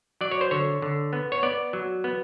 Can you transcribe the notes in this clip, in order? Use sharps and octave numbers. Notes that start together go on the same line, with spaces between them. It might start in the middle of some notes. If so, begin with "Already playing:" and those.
F#3 D5
C#5
C5
D3 C#5
D3
B3
C#5
B3 D5
F#3
B3